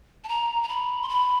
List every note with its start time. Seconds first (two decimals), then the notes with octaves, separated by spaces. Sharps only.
0.24 A5
0.28 A#5
0.63 A#5
0.68 B5
1.02 C6
1.09 B5